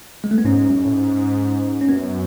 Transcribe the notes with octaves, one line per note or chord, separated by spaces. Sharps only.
G#3
A3
B3
G#2 C#4
F#2
A2
G#2
C#4
F#2 B3